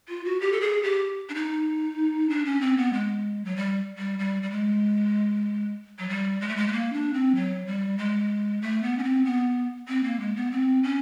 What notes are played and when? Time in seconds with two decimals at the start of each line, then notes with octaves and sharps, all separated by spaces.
0.09 F4
0.25 F#4
0.40 G4
0.52 A4
0.61 G#4
0.83 G4
1.29 D4
1.35 D#4
2.30 D4
2.45 C#4
2.61 C4
2.77 B3
2.93 G#3
3.45 F#3
3.57 G3
3.98 G3
4.19 G3
4.43 G3
4.51 G#3
5.99 F#3
6.09 G3
6.41 G#3
6.49 A3
6.57 G#3
6.68 A3
6.72 A#3
6.93 D4
7.14 C4
7.35 F#3
7.67 G3
7.98 G#3
8.62 A3
8.83 B3
8.98 C#4
9.04 C4
9.25 B3
9.88 C4
10.04 A#3
10.20 G#3
10.36 B3
10.52 C4
10.83 C#4